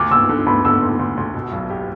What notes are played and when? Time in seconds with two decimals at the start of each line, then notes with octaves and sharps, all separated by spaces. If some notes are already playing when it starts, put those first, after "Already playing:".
Already playing: D2 D6
0.11 D2 E6
0.29 D3
0.46 D2 B5
0.65 D3 E6
0.82 D2
0.99 D2
1.17 D2
1.34 B2
1.52 B1
1.70 G4